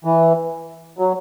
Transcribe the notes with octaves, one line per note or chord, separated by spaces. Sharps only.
E3
F#3